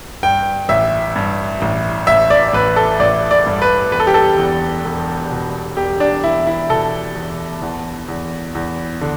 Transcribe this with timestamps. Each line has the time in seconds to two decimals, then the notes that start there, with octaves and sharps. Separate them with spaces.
0.23 G2 G5
0.69 A1 E5
1.16 G2
1.62 A1
2.07 A1 E5
2.30 D5
2.53 A1 B4
2.76 A4
2.99 A1 D5
3.31 D5
3.46 G2
3.62 B4
3.92 E1 B4
4.00 A4
4.07 G4
4.14 A4
4.38 E2
4.85 E1
5.31 B2
5.77 E1 G4
6.00 D4
6.24 E1 E4
6.47 E4
6.69 B2 A4
7.15 E2
7.62 E2
8.08 E2
8.55 E2
9.01 D3